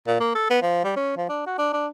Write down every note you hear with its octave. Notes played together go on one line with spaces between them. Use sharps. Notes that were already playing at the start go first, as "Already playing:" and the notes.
A#2
A#3
A4
B3
F3
G3
C#4
F3
D4
F#4
D4
D4